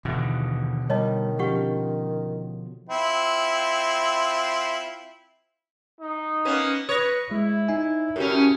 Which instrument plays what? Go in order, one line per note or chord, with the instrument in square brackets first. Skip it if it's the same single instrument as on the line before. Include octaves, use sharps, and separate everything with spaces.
[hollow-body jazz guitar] D#2 E3 E5 [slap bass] B2 D3
[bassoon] D#3 [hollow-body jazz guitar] G3 [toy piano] C#5 D#5 A5
[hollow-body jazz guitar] F3 C#4 [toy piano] G4 F#5 C#6
[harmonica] C4 E4 F4
[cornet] D#4
[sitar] A#3 B3 C#4
[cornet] B4 [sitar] C#5 [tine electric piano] D#6 A#6
[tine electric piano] G#3 [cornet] E4
[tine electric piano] D#4 E5 G#5
[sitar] A2 C#3 C#4 [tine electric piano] F#4 G4 A#4